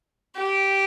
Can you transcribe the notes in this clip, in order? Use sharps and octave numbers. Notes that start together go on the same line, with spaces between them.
G4